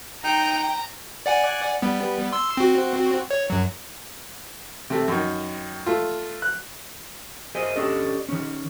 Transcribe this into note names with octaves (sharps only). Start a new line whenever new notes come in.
D#4 G5 A#5
D5 F#5 G#5
G3 B3
C6 E6
C4 F#4
C#5
F#2 F#3
C3 A3
F#2 D#3
A3 F4
F#6
G#4 A#4 C5 D#5 E5 G#5
C#4 D4 G4 A4 D#5
D#3 C#4